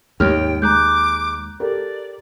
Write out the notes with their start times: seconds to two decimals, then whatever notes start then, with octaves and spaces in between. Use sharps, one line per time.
0.20 D#2 G#2 A#3 G4 C#5 G5 F6 F7
0.62 G#3 A#5 D6 F#6 G6
1.60 G4 A4 A#4 D5